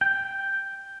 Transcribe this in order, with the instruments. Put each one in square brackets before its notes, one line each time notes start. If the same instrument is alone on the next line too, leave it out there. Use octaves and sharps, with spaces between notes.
[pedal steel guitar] G5